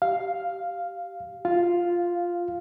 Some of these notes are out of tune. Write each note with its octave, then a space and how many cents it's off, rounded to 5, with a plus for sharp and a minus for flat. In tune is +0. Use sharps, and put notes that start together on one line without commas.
G4 -25 F5 +0
F4 +0 F5 +0